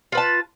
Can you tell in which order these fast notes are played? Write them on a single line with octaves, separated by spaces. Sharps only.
F4 B4 A5